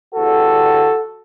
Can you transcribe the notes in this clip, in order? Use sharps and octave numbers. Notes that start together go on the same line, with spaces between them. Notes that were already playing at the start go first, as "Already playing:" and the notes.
E2 D3 G3 F#4 A4